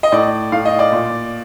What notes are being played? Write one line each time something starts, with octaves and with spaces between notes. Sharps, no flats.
D#5
A2 D5
A2 F5
D#5
D5
A#2